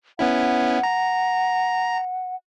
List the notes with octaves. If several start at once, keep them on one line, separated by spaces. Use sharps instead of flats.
B3 C#4 E4 F#5
A#5